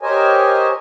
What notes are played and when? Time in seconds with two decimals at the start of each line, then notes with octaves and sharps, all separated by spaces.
0.01 G4 A#4 C5 C#5 D#5 G#5